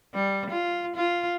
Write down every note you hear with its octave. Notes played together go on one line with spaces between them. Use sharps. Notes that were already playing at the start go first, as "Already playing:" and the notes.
G3
F4
F4